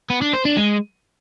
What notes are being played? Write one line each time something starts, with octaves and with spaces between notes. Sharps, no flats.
B3
D4
C5
D4
G#3